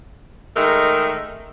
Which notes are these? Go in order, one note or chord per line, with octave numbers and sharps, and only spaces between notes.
D#3 G#3 A3 A#4